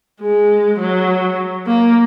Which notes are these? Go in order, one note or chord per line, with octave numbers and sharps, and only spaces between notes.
G#3
F#3
A#3